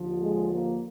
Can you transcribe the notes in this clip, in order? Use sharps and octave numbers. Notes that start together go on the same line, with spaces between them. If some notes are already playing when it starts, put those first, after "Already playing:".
Already playing: D#2 D3 F3
G#3
A#3